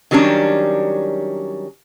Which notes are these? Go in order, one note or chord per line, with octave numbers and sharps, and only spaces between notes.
D#3 F#3 G3 C#4 D4